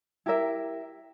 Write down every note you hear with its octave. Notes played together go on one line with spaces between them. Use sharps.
E4 G4 A#4 E5